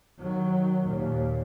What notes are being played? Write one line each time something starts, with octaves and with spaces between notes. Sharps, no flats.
D#3 F#3
D#2 A#2